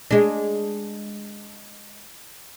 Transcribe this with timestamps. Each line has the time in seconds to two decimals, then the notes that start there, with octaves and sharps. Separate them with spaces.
0.11 G#3 D4